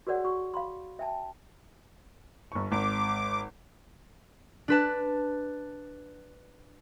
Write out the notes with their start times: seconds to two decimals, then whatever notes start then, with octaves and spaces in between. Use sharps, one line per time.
0.07 F#4 G#4 A#4 C#5 D5 F#5
0.24 F#4 C#6
0.54 F5 B5 C6
0.99 E5 G5 A5
2.52 G1 C#6
2.72 G#1 D6
4.68 D4 B4 A5